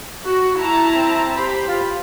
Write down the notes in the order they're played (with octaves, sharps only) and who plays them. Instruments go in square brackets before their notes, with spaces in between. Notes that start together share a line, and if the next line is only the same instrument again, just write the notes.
[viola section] F#4
E4 A5 A#5
[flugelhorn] C4
[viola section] G4 B5 [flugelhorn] C5
[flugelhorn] F4